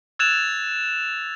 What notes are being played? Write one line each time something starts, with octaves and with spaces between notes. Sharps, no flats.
E6 F#6 G#6 A6 E7 F7